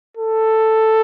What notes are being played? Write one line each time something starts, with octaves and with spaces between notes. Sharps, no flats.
A4